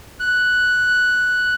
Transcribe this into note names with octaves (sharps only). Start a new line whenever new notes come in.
F#6